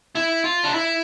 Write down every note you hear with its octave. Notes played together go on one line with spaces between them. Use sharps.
E4
F4
D4
E4